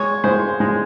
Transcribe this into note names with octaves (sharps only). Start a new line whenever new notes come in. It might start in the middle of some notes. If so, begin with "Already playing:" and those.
Already playing: G#3 C#5
G#3 C5
G#3